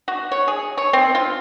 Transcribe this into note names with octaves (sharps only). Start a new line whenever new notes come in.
F#4
C#5
G#4
C#5
C4
F4